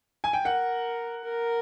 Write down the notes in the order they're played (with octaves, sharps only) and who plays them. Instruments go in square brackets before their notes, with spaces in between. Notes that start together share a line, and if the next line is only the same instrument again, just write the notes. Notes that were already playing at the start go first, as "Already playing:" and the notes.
[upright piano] G#5
G5
[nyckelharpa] A#4 [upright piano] F#5
[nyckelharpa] A#4